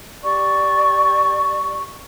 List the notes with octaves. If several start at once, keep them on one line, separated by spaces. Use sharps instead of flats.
G4 D5 C#6